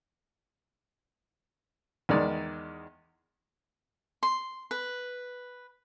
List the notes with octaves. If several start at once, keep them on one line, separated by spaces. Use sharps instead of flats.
E2 D#3 G#3 D5
C6
B4